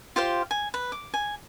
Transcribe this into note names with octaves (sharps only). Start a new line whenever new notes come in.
F4 G4 C5 F5
G#5
B4
D6
G#5